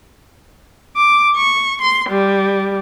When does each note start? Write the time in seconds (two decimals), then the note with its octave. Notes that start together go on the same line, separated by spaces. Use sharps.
0.96 D6
1.36 C#6
1.81 C6
2.10 G3